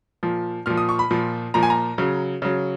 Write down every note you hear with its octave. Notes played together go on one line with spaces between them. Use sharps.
A#2 F3
A#2 F3 F6
D#6
C#6
B5
A#2 F3
A#2 F3 A#5
G#5
A#5
C#3 F#3
C#3 F#3